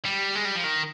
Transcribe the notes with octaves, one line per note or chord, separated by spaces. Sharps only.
G3
G#3
G3
F3
D#3